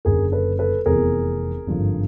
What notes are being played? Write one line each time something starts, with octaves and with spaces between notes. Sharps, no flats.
F#1 F#2 D3 G#4 A#4
A4 B4
A4 B4
F1 E2 C3 E3 G#4 A#4
G#1 G2 D3 F3